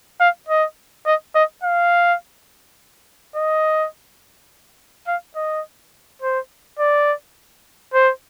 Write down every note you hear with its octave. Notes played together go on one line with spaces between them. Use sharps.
F5
D#5
D#5
D#5
F5
D#5
F5
D#5
C5
D5
C5